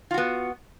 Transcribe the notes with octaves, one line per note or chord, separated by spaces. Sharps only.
B3 F4 F#4